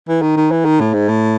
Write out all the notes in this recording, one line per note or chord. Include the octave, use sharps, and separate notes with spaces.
E3
D#3
D#3
E3
D#3
A2
G#2
A2